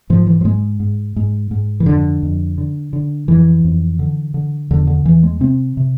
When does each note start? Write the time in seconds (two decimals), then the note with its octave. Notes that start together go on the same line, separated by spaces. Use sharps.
0.10 G#2 F3
0.27 E3
0.41 F3
0.45 G#2 G#3
0.80 G#2
1.16 G#2
1.51 G#2
1.80 E3
1.86 F2 D3
2.23 F2
2.58 D3
2.93 D3
3.28 F2 E3
3.64 F2
3.99 D3
4.34 D3
4.71 E2 D3
4.87 D3
5.05 E2 E3
5.23 G#3
5.40 C3 C4
5.77 C3